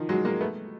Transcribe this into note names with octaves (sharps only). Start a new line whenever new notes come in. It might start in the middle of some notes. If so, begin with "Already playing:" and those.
Already playing: D#3 F3
F#3 G#3
G#3 A#3
A3 B3